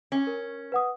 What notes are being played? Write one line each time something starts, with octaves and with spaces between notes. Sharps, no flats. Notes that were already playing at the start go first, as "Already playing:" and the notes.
C#4
A#4
B4 F#5 D#6